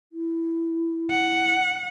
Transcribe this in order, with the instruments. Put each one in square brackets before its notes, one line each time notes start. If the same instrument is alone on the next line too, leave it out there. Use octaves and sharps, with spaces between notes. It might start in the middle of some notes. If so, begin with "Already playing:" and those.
[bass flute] E4
[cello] F#5